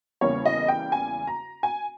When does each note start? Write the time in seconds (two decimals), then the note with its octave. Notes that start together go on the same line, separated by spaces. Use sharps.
0.21 E2 C#3 G3 A#3 C#5
0.46 D#5
0.68 G5
0.92 G#5
1.27 A#5
1.63 G#5